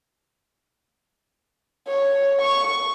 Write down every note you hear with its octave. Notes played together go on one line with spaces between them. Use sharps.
C#5
C#6